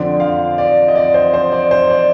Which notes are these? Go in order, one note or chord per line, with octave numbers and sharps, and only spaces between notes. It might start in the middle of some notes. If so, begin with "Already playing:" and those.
Already playing: F2 D3 F3 C4 D5
F5
D5
D#5
D5
C5
C5
D5
C5
D5